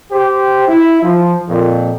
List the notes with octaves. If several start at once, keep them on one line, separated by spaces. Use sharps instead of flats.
G4 C5
E4
F3
F2 A#2